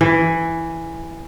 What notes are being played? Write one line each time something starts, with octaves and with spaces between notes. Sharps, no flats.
E3